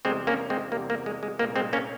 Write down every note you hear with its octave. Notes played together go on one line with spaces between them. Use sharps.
E2 C3 G3 G#3 C4
A#3 C#4
G#3 C4
E2 C3 G3 A#3
A#3
G#3
G#3
C2 A#2 G#3 A#3
G#3 C4
A#3 C#4